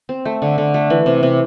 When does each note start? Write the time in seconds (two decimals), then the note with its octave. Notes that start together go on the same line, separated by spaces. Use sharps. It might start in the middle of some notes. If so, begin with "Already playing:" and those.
0.09 C4
0.25 A3
0.42 D3
0.58 D3
0.74 A3
0.90 E3
1.06 C3
1.23 C3